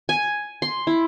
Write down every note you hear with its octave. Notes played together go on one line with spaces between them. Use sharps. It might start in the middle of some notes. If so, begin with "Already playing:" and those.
G#5
C6
E4